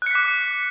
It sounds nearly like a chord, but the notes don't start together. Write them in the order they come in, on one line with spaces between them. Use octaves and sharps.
F#6 C#7 B6 D6